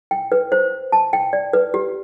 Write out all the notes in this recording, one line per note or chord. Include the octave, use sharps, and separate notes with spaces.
G5
B4
C5
A5
G5
D5
B4
G4